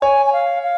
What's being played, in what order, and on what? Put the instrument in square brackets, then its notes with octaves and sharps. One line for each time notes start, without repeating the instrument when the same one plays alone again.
[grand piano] C#5 [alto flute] G#5
[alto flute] G#5
F5
F5